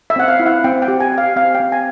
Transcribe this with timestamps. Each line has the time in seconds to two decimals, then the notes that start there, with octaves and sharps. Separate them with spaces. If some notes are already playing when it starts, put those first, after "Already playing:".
0.10 E5
0.16 C4 F#5
0.28 F5
0.40 E4
0.46 F#5
0.64 C4 G5
0.82 G5
0.88 G4
1.00 G#5
1.12 G4
1.18 F5
1.36 C4 F5
1.55 G5
1.60 C4
1.72 G#5